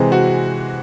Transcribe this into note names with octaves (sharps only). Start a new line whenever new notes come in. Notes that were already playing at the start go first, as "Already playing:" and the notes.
Already playing: C3 E3 G#3 C4
F#4